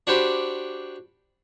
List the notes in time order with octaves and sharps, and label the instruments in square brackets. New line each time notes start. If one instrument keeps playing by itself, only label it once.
[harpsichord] D4 F#4 G4 C5 B5